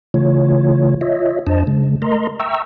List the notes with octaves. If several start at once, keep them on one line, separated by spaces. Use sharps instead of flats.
C#3 E3 A3 F4 C#5
F4 C#5 D#5 E5
F2 D4 C5 D#5 A5
C#3 G#3
A3 A#4 D#5 A#5 C6
E5 G5 A#5 C#6 E6